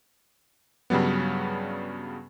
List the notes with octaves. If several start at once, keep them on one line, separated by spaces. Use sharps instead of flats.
G2 C#3 F#3 G3 B3